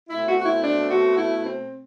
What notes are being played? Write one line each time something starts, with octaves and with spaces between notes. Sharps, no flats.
B2 A3 C4 E4
F#4
F#4
E4
D4
F#4
E4
C4